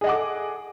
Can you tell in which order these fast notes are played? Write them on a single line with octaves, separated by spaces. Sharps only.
G#4 D#5 F#5 D6 A4